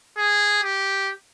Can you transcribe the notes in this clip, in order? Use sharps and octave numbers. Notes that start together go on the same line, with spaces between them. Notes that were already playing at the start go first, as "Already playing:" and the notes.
G#4
G4